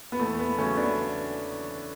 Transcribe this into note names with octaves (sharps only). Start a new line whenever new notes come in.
B3
E2 A3
B3
C#3 F#3 A3 C#4
B3 D4